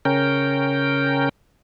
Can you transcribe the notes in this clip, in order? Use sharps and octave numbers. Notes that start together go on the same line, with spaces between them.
C#3 C#4 A#4 G5